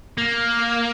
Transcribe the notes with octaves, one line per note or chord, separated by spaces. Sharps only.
A#3